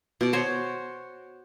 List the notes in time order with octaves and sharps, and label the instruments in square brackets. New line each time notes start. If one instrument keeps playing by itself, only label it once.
[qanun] B2 D5
F#4 C5 C#5